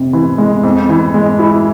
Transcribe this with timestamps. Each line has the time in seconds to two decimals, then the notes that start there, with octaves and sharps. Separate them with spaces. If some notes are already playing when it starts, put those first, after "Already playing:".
Already playing: F2 C3
0.13 E3
0.38 G#3
0.63 F2
0.89 E3
1.14 G#3
1.39 E4